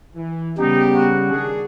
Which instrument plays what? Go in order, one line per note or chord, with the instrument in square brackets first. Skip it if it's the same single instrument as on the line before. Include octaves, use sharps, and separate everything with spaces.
[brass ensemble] E3
[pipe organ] C#3 G3 [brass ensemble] B3 G4 [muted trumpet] D#4
[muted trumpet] F#4
[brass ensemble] D#3 D4 G#4